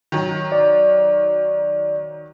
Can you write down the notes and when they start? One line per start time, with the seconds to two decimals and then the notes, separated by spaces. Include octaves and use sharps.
0.12 D#3 F#3
0.52 D5